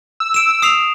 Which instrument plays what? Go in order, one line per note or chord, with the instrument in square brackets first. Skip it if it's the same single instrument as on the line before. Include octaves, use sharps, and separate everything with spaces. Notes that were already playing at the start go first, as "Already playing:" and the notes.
[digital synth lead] E6
[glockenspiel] D7 E7
D#6 C7 F7